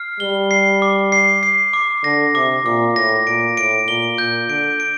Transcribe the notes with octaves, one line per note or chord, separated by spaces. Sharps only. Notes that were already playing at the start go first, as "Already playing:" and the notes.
Already playing: F6 C7
G3 G7
C7
D6
C7
C7
D6
D3 A#6
C3 D6
A#2 D6
A2 A#6
A#2 D7
A2 D7
A#2 G7
A#2 G6
D3 D7
D7